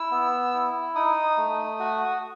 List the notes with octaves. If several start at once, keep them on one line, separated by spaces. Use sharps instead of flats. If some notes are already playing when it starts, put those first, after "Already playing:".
Already playing: E4 E6
B3
E4
D#4 D#6
A3
F#4